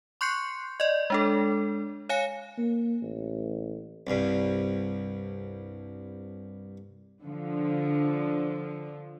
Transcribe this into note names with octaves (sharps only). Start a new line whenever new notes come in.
C6 C#6 F#6 G6 C7 C#7
D5 D#5
G#3 D4 A4
C#5 F5 G#5 C#7
A#3
A1
C2 G2
D3 F3